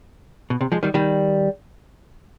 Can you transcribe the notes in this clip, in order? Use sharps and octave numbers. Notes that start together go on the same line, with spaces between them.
B2
C3
F3 G#3
D#3 G3
D#3 G3